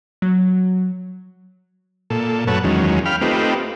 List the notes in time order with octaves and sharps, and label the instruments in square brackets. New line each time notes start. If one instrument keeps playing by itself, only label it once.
[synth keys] F#3
[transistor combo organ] A#2 A4
F#2 A3 B4 C#5 F#5 A5
E2 D#3 F#3 G#3 C#4
F5 G5 B5 F6
A3 C4 D#4 F4 G4 B4